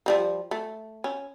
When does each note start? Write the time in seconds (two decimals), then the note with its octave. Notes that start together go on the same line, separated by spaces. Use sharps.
0.06 F3 G3 A#3
0.51 A3
1.04 C#4